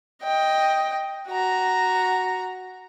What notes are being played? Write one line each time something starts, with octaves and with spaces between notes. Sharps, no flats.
D#5 G5
F#4 A#5